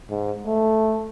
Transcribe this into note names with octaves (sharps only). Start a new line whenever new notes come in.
G#2
A3